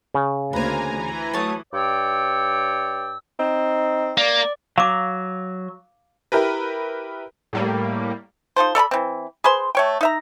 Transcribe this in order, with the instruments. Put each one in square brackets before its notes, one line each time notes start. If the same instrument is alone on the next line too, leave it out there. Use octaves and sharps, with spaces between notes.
[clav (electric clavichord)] C#3
[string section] D2 A#3 [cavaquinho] B4 C5 [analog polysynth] G#5 A#5
[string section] E3
[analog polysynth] F#3 A3 D#6 [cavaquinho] C#5 A5
[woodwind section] G2 C#5 D5 G5 E6
[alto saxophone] C4 [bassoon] D#4
[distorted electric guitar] A#3 [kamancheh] D5
[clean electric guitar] F#3 [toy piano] F5 D6
[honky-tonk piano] E4 G4 A#4 B4
[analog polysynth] A2 G3 A#3
[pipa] D#4 F4 A4 C5
A4 D5 A#5 B5
E3 C4
G#4 B4 C5 C6
A3 C#5 G5
D#4 E5 A#5